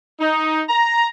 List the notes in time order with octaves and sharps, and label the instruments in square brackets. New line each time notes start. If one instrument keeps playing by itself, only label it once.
[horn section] D#4
A#5